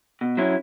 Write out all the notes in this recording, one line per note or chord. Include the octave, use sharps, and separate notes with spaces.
B2
F#3 C#4 E4